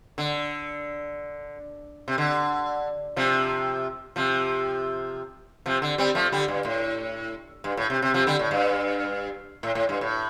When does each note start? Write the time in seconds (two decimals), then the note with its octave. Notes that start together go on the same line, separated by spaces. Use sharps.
0.18 D3
2.08 C3
2.18 D3
3.16 C3 F3
4.16 C3 F3
5.66 C3 F3
5.82 D3
5.98 G3 C4
6.15 F3 A3
6.32 D3 G3
6.48 G2
6.65 A2
7.64 G2
7.77 A2
7.90 C3
8.02 C3
8.14 C3 F3
8.27 D3 G3
8.39 A2
8.51 G2
9.63 A2
9.75 A2
9.89 G2
10.01 A2